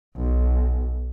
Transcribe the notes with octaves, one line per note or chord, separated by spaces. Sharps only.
B1